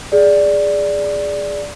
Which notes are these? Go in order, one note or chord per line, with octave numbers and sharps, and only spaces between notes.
G#4 D5